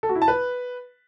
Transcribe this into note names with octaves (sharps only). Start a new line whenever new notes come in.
A4
F#4
E4
A5
B4